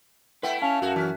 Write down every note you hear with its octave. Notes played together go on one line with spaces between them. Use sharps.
A3 E4 B4 F#5 G5
C#4 F5 A5 F7
F#2 F#4
E3 F#3 C#4